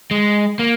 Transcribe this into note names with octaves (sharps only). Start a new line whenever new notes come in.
G#3
A#3